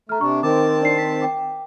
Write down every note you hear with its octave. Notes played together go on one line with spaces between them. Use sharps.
A3 A#5 F6
C3 D4 C#6
D#3 C4 A5 D6
D4 D5 C7
B6
G5 D6